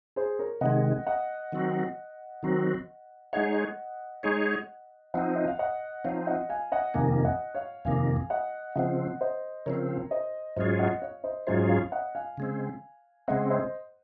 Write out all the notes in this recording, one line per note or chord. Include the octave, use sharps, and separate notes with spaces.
G#4 C5
A#4 C#5
C3 D#3 G#3 D#5 F#5
D#5 F#5
D#3 F#3 C4 F#4
D#3 F#3 C4 F#4
G#3 D#4 G#4 C#5 D#5 F#5
G#3 D#4 G#4 C#5
F3 C4 D#4 D#5 F#5
D#5
F5
D#5 F#5
F3 C4 D#4 C#5 F5
D#5 F#5
F5 G#5
D#5 F#5
F2 C3 D#3 A#3 F5 G#5
D#5 F#5
C#5 F5
F2 C3 D#3 A#3 F5 G#5
D#5 F#5
C#3 F3 C4 D#5 F#5
C5 D#5
C#3 F3 C4 A#4 C#5
C5 D#5
G#2 F#3 C#4 F4 G#4 C5 D#5
D#5 F#5
C#5 F5
C5 D#5
G#2 F#3 C#4 F4 G#4 C5 D#5
C#5 F5
D#5 F#5
F5 G#5
C#3 G#3 C4
C#3 G#3 C4 D#5 F#5
C5 D#5